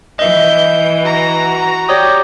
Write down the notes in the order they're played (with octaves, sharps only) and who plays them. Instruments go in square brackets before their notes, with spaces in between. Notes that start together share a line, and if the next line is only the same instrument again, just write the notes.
[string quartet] E3 [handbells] D#5 E5 [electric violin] G6
[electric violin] F#4 A#5
[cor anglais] G4 [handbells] C#5 D5 D#6